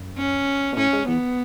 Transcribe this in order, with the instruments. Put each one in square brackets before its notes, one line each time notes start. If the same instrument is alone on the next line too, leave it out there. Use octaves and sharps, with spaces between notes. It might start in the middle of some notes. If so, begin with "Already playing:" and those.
Already playing: [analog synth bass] F#2
[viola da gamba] C#4
[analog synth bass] B2
[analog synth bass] A2 [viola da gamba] C#4
[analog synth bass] G#2
[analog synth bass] E2 [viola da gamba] B3